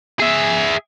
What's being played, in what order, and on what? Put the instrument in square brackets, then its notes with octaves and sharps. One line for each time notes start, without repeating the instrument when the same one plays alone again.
[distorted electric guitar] G#4 E5